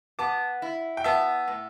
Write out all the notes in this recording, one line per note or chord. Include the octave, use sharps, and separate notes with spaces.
B3 A5 D6
E4
G5
B3 E5 A5
A2